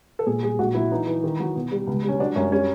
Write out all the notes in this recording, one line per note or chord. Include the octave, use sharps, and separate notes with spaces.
A4
A#2 G#4
G3 G#4
A#1 F#4
F#3 E4
E3 D#4
E3
D#3
F#3
B2
G3
C#2
G3
C#4
F#3 D4
F#2 C#4
G3 C#4